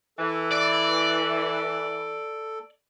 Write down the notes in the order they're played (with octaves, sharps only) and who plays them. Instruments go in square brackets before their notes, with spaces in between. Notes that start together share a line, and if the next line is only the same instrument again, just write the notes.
[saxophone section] E3 [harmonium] A4
[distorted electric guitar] D5